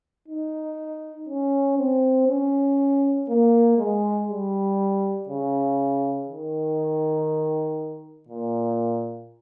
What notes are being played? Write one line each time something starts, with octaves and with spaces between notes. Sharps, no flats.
D#4
C#4
C4
C#4
A#3
G#3
G3
C#3
D#3
A#2